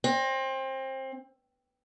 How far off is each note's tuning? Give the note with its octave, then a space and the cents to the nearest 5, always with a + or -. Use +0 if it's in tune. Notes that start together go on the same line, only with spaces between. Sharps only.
C4 +25